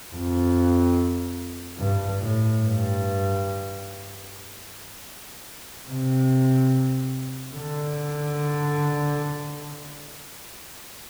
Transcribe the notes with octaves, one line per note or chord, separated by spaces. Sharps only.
F2
G2
A2
G2
C3
D3